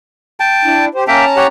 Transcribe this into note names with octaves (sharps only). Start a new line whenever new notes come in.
G5 A5
D4 E4
G4 C5
A#3 C#4 E5 G5 A5 A#5
G4 C#5 F#5